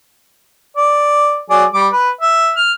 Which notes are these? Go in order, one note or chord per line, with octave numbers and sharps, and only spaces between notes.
D5
F#3 G#4 D5
G3 D6
B4
E5
F6